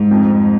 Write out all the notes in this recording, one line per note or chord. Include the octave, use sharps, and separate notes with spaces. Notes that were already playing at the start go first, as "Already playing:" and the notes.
Already playing: G#2
F2